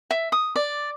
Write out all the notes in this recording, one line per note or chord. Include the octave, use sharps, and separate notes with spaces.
E5
D#6
D5